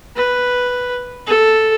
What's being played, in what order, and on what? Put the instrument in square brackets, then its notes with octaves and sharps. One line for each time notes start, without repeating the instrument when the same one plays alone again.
[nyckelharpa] B4
A4